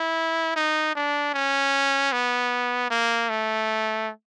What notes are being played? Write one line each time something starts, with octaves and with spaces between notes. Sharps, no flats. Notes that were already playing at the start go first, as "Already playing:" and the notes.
Already playing: E4
D#4
D4
C#4
B3
A#3
A3